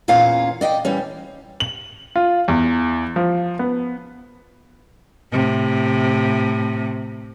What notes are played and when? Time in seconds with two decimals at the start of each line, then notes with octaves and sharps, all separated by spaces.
0.08 E2 A#2 C#4 F4 F5
0.61 D5 D#5 F5 G5
0.85 E3 G3 C#4
1.60 F#7
2.16 F4
2.48 E2
3.16 F3
3.59 B3
5.32 A2 C3